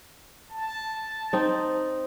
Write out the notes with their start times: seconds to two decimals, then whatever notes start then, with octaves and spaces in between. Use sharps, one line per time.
0.50 A5
1.33 C4 D#4